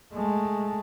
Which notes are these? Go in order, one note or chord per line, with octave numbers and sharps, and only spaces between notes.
G#3 A3